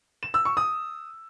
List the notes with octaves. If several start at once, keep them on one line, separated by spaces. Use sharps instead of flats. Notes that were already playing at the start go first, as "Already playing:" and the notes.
E7
E6
C#6
D#6